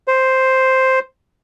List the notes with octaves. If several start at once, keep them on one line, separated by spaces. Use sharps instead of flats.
C5